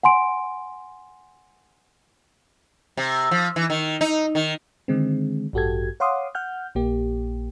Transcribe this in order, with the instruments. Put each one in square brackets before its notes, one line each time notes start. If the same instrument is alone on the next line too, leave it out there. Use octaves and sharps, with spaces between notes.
[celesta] F#5 G#5 C6 D7
[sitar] C3
F3
E3
D#3
D#4
D#3
[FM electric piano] D3 D#3 G#3 C4
A1 G2 F#4 G4 A4 G#6
C#5 F5 F#5 C6 D6 D#6
F#5 F6 G6
A#1 A#3 G4